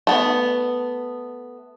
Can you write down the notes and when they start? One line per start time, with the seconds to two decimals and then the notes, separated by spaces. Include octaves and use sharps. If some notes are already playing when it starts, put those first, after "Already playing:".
0.07 A3 B3